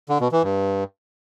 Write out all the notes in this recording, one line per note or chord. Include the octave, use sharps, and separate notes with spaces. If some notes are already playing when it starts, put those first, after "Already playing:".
D3
B2
E3
G2